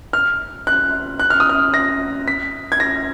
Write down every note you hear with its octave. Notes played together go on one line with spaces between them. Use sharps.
F6
F#6
F#6
F6
D#6
F6
A#6
B6
G#6
A#6